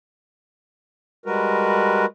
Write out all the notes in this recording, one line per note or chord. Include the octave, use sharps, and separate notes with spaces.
G3 G#3 F#4 A#4 B4